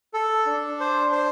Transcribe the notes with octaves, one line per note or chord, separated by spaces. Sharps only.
A4
D4
C5
C5